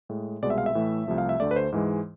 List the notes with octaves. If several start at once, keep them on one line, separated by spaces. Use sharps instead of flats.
A2 G#3
C2 B2 G#3 D5
E5
F5
E5
A2 E3 A3
C2 C3 F3 A3
F5
E5
D2 D3 A3 D5
B4
C5
G#2 E3 G#3